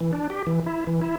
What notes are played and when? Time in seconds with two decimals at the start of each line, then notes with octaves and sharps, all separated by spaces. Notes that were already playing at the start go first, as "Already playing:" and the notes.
0.01 E3
0.13 D4
0.30 G4
0.47 E3
0.66 E4
0.87 E3
1.02 E4